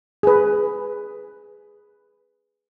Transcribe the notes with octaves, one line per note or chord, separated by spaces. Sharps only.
G#4 B4